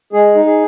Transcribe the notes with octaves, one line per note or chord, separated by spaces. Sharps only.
G#3 G#4
D#4
G#4